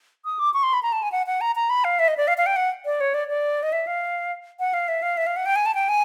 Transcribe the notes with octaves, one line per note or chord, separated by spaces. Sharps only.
D#6
D6
C#6
C6
B5
A#5
A5
G#5
F#5
F#5
A#5
A#5
B5
F5
E5
D#5
D5
F5
F5
G5
F#5
D5
C#5
D5
D5
D#5
E5
F5
F#5
F5
E5
F5
E5
F5
F#5
G5
G#5
A5
G5
G#5